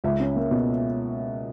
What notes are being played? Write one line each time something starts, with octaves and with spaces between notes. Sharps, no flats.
C#2 E5
C#4
A#3
B2